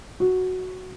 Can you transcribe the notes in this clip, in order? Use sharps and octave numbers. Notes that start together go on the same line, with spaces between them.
F#4